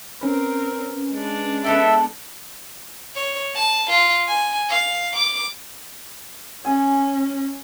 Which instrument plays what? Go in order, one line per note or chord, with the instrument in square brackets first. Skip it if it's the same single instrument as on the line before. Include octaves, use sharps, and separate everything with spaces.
[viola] C4 A#4 [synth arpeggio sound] C#4 B4
[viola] G#3 D4
[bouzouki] B3 A4 G5 [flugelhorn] E5
[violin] C#5
A5
F4
G#5
F5
D6
[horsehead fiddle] C#4 [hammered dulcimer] G#5